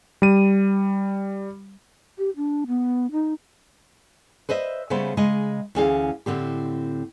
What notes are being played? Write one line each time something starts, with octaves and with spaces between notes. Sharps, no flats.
G3 D#7
G4
D4
B3
D#4
B4 C5 D#5 E5
C#3 G3 A3 B3 C#4 C5
C#3 G#3 D#5
D2 E3 C#4 G#4 D5 F5
A2 D3 C4 G4